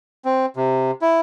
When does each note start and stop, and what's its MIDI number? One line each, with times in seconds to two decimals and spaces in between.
0.25 0.46 60
0.56 0.91 48
1.02 1.21 64